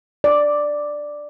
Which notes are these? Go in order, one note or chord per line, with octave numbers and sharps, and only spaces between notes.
D5